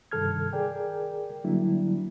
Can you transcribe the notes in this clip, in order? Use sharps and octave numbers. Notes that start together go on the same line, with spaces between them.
G2 C3 D#3 A4 F6 G#6
G#4 A#4 D5 G5
D3 F#3 G3 A#3 D4 E4